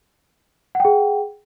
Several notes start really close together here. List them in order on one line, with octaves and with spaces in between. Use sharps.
F#5 G5 G#4